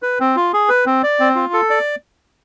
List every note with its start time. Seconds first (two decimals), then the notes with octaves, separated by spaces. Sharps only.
0.02 B4
0.20 C4
0.36 F4
0.53 G#4
0.69 B4
0.86 C4
1.03 D5
1.20 C4
1.35 F4
1.53 A4
1.70 D5